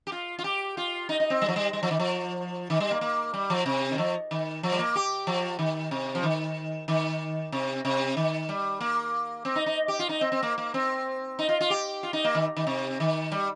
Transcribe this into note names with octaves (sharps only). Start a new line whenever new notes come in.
G4
F4
F4
G4
F4
D#4
D#4
C4
G3
F3
G3
G3
F3
D#3
F3
D#3
G3
A#3
A#3
G3
F3
C3
D#3
F3
D#3
F3
G3
A#3
G4
F3
D#3
C3
F3
D#3
D#3
C3
C3
D#3
G3
A#3
C4
D#4
D#4
G4
F4
D#4
C4
C4
A#3
A#3
C4
D#4
F4
F4
G4
F4
D#4
A#3
D#3
D#3
C3
D#3
G3